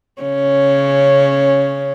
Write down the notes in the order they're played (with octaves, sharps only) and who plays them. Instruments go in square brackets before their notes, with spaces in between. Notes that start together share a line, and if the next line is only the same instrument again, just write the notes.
[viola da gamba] C#3 C#4